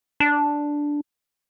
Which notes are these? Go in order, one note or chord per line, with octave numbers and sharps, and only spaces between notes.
D4